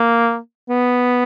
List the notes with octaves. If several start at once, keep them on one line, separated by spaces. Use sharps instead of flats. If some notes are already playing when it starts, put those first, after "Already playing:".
Already playing: A#3
B3